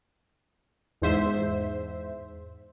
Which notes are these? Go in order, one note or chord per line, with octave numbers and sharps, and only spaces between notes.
E2 G#2 C5 E5